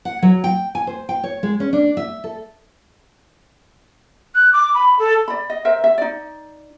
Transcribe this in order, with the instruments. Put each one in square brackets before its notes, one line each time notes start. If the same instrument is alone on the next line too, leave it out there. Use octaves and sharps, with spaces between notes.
[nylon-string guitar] F#5
F#3
G5
G#5
C5
G5
C#5
G#3
C#4
D4
E5
A4
[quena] F#6
D6
B5
A4
[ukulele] D5 B5
D#5
A#4 C5 E5
E5
D#4 D5